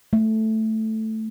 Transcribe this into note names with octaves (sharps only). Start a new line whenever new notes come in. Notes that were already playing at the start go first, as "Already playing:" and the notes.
A3